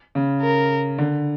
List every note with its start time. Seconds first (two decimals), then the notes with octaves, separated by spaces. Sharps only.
0.15 C#3
0.42 A#4
0.98 D3